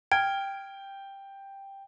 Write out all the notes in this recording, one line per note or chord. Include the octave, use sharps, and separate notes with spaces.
G5 F6 G#6 D7